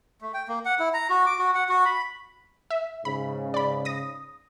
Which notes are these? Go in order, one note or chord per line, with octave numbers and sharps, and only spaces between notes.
A3
G5
A#3
F#5
E4
A#5
F#4
D6
F#4
F#5
F#4
B5
E5
G#2 C#3 B5
D5 B5
D#6 A#6